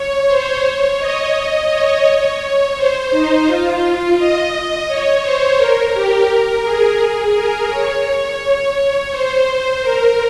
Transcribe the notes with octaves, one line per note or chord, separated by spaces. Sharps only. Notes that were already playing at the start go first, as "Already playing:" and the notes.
Already playing: C#5
C5
C#5
D#5
D#5
C#5
C5
D#4
F4
F4
D#5
C#5
C5
A#4
G4
A#4
G#4
A#4
C#5
C5
A#4